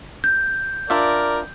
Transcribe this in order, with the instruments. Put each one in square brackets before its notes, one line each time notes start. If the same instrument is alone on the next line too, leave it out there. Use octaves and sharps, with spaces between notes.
[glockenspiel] G6
[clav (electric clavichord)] D4 F4 E5 [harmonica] A#4 D5